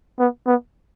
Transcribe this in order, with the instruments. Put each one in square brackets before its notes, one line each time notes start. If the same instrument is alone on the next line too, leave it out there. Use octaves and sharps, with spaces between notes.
[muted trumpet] B3
B3